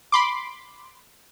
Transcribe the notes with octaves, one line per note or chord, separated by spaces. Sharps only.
B5 C6 D6